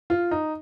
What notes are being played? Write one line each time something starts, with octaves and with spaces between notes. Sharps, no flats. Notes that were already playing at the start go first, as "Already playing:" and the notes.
F4
D#4